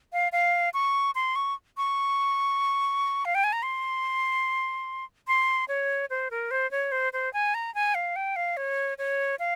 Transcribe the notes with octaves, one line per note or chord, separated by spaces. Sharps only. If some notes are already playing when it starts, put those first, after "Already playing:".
F5
F5
C#6
C6
C#6
C#6
F5
G5
G#5
A#5
C6
C6
C#5
C5
A#4
C5
C#5
C5
C5
G#5
A#5
G#5
F5
G5
F5
C#5
C#5
F5